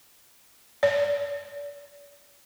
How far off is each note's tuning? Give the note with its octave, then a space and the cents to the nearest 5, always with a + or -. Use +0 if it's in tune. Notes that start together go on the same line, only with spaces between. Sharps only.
D5 -30